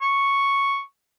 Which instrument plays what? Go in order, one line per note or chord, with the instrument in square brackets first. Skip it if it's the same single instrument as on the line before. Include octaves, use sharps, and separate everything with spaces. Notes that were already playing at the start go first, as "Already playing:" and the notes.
[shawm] C#6